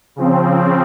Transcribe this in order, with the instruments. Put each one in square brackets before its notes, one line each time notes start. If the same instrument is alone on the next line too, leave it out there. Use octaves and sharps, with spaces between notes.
[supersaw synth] C#3 F3 C4